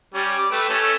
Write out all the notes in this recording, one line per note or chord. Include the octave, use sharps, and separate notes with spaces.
G3 C#4
D6
A3 G4 B4
A3 C#4 A4